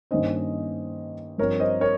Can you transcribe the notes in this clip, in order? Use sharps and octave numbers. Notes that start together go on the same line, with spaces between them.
G2 D#3 A#3 C#4 C5 D#5
G2 F3 C4 A#4 C#5
C5 D#5
A#4 C#5